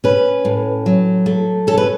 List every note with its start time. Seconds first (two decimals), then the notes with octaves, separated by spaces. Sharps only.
0.04 C#4 B4
0.45 A2
0.86 F#3
1.26 A3
1.67 C#4 A4
1.78 B4